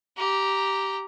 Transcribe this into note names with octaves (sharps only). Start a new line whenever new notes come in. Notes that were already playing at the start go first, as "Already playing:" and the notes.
G4 A#5